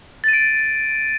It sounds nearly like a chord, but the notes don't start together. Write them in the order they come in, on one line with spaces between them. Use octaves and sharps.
A6 D#7 D7